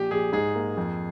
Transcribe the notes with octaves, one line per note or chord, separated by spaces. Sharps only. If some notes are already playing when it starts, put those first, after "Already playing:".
Already playing: A#1 G4
A#1 G#4
G#2 G#4
A#3
F2